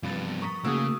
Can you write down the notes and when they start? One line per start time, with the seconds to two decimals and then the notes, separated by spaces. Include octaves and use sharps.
0.03 G2 C3 F3 B3 F4 A6
0.42 A#4 A#5 C#6 D#6 B6
0.65 C#3 A3 A#3 D#4 F#4 G#4 D#6 E6